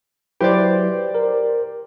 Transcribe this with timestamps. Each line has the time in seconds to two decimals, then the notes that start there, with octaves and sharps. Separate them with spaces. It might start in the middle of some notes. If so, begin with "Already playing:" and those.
0.41 F#3 E4 G4 B4 C5 D5
1.15 A#4